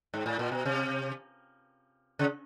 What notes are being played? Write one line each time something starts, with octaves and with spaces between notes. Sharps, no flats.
G#2
A2
A#2
B2
C3
C#3